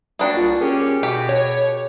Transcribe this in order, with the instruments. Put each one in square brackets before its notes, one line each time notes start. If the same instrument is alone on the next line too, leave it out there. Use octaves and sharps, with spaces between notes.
[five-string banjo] A#3 D4 F#4 [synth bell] G5 B5 D#6
[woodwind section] C2 [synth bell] F4
[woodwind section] C#4 G4 [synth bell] G#4 A#4 G5
[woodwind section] B2 [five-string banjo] G4
[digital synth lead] C#5